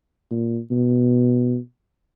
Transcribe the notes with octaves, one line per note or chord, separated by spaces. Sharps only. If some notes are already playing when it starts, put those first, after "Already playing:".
A#2
B2